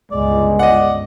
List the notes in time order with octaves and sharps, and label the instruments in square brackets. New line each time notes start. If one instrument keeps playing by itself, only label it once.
[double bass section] G1 C#2 [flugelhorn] G#3 [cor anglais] D5
[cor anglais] D5 [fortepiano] D#5 F#5